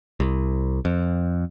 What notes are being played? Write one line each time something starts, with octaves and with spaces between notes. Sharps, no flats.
C2
F2